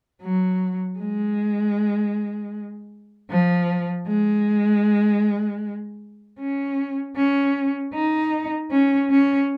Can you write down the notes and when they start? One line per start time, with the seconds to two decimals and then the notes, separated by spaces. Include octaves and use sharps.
0.22 F#3
0.98 G#3
3.30 F3
4.08 G#3
6.40 C#4
7.16 C#4
7.94 D#4
8.71 C#4
9.11 C#4